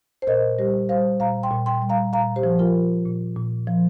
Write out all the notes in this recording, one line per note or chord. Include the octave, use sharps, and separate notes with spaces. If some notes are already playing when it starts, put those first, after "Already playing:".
C5
A#2 A#4 D#5
G3 G4 C5
G3 C5 F5
A#2 F5 A#5
G5 C6
A#2
G5 C6
G3
F5 A#5
A#2 F5 A#5
G4 C5
F3
F4 A#4
F3
A#2
A#2
F3